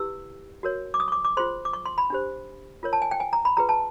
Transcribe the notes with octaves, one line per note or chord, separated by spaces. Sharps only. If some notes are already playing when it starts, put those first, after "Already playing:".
Already playing: E4 G4 B4 E6
F#4 A#4 C#5
D6
D#6
C#6
D6
D6
F4 G#4 C5 C6
D6
C#6
C6
B5
D4 G4 C5
F4 A#4 C#5
A5
G#5
G5
G#5
A#5
B5
F4 G#4 B4 A#5
A5